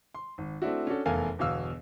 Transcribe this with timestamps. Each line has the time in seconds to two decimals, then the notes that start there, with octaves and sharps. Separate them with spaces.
0.15 C6
0.38 G#1
0.62 A3 C4 D4 E4 F#4
0.87 C#4 D4 F#4 A4
1.05 F1 E2 A4 A#4 F5 G#5
1.38 G1 E2 B2 F5 E6